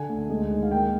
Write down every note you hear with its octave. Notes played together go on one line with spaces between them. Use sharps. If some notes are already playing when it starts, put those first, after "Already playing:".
Already playing: D3 G#5
D2
G#3
D#3
F5
A#3 G5